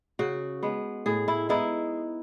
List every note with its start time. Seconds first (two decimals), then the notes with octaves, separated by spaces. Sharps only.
0.19 C#3 F#4
0.63 G#3 B3
1.06 A2 G#4
1.28 E4
1.49 G#3 B3 D#4 E4